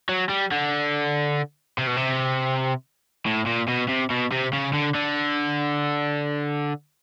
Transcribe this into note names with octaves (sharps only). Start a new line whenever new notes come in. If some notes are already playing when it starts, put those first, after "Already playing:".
F#3
G3
D3
C3
B2
C3
A2
A#2
B2
C3
B2
C3
C#3
D3
D3